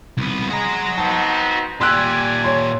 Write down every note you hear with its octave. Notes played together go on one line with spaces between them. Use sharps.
C2 B3
G#3 F#4 A#5
B3 C4 D#4 A5
A#2 G4 D5 G#5 C6 E6 F#6
C#5 C6